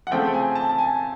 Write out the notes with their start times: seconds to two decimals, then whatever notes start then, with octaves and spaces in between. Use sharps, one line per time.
0.07 F#5
0.11 C#3 F3 A3 C4 G5
0.34 G#5
0.55 A5
0.69 A5
0.78 G#5